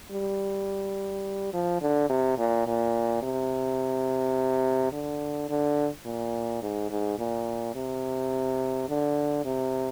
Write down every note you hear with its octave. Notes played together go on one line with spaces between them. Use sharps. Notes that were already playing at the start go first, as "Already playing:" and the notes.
G3
F3
D3
C3
A#2
A#2
C3
D3
D3
A#2
G#2
G#2
A#2
C3
D3
C3